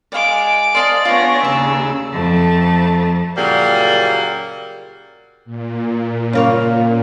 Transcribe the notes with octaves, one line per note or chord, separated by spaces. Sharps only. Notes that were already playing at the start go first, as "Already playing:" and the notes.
G#3 D5 F5 D6
C5 D5 D#5 F5 A5
B3 D4 F4 G#4 C#5 A#6
D#2 C#3 C#6 E6
F2 A3 A5
A#2 C#3 F#3 G3 A#3
A#2
C#3 A#3 C#5